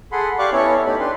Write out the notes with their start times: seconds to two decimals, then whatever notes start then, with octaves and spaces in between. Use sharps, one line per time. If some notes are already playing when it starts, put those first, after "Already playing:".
0.12 G#4 A4 F#5 B5 C6
0.39 G4 D5 F5 C#6 D6 F#6
0.53 B3 C#4 E4 A4 C#5
0.86 A3 C#4 D#4 G4 B5
1.00 D4 G4 B4 C6